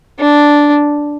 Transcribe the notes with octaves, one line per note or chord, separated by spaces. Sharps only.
D4